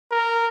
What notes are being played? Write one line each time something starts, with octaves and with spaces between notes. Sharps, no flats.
A#4